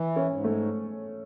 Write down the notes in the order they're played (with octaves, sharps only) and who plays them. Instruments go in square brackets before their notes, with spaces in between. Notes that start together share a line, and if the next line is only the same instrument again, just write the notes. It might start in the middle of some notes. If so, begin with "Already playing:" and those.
Already playing: [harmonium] E3
[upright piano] C#4
[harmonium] G#2
[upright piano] A3